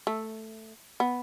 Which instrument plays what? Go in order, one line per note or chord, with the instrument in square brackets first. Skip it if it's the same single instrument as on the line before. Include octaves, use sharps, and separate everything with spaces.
[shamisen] A3
B3